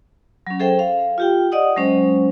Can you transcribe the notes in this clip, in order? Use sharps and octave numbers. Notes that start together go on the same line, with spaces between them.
F#3 C#4
G#4 A4 C5 E5 G5
F5
F4 G4 G5
D5 D#5 F#5 D#6
F#3 G#3 C#4 C5